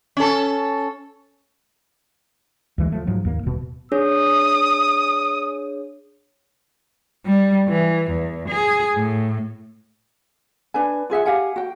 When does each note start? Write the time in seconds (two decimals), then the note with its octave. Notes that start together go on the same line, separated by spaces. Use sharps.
0.17 C#4 A4
2.78 D2 E3 G#3
2.92 F3 A3
3.07 G#2 F3 F#3
3.25 D#2 A#3
3.43 D#1 B2
3.92 D4 G#4 C#5 D#6
7.25 G3
7.66 E3
8.09 E2
8.48 G#4
8.94 A2
10.74 D4 B4 G#5
11.10 F4 G#4 E5 F#5
11.26 G4 F5 F#5 G#5
11.56 F#4 G5